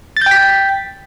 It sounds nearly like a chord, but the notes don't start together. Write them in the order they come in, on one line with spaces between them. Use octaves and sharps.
A6 G6 G5 B6